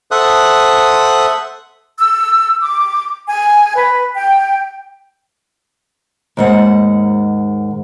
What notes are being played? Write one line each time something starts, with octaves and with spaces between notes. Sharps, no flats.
A4 C5 E5 F#5 D#6 F#6
E6
D6
G#5
B4
G5
D#2 G#2 F#5